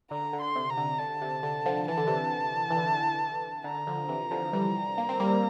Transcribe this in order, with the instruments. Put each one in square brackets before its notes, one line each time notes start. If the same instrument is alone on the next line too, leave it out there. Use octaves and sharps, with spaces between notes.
[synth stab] D3 [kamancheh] A#5
[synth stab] D3
[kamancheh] C6
[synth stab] C3
[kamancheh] A#5
[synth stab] D3
[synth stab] D3 [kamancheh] A5
[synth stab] C3
D3
D3 F3
[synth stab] E3 [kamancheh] A5
[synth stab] D3
C3 E3
E3
D3
[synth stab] D3 [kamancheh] A#5
[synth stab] D3 F3
C3 E3
D3 F3
E3 G3
A#3
C4
G3 A#3